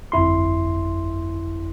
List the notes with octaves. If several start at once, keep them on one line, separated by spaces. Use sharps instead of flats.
G1 F2 E4 C6